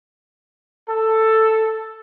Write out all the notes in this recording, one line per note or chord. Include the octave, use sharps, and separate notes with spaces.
A4